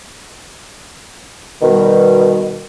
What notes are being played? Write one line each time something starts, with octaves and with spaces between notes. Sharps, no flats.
B2 D#3 G3